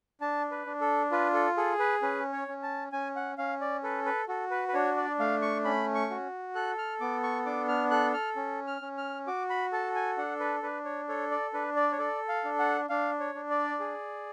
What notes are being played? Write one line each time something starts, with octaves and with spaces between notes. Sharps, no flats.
D4 A5
B4
D4
A4
F4 B4
A4
G#4 A4
B4
C#4 B4
C#5
C#4
A5
C#4 G#5
F#5
C#4 F5
D5
A4 B4
B4
F#4 A4
B4
B4
D4 C#5
D5
A3 F5
C#6
C#4 B5
C#6
F#4
A4 F#6
F6
B3 D6
C#6
D4 D6
F6
A4 F#6
F6
C#4
F6
C#4
F6
F#4 D6
B5
A4 A5
G#5
D4 F#5
B4
D4 B4
C#5
A4 C#5
D5
D4 B4
D5
C#5
A4 D5
F5
D4
F#5
D4 F5
C#5
D4
D5
G#4